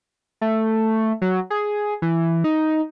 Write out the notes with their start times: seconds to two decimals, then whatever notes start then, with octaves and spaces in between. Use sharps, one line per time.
0.41 A3
1.21 F#3
1.50 G#4
2.02 E3
2.44 D#4